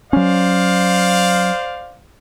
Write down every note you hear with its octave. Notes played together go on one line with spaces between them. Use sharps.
F#3 C#4 C5 D5 F5